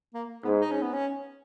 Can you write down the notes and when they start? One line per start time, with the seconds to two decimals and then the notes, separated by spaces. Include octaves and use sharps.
0.14 A#3
0.45 G#2 B3
0.61 D#4
0.71 C#4
0.82 B3
0.93 C#4